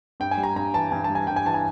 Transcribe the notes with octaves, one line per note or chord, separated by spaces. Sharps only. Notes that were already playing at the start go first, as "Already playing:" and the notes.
G2 G5
G#5
G3
A#5
G2 A#5
E3 A5
G2 G#5
A5
G3
G#5
G2 G5
G#5
E3 A5
G#5